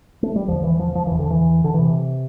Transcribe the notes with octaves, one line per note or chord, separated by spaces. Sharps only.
A3
G3
E2 D3 F3
E3
F3
F3
E2 D3 E3
D3
E3
D3
C3 E3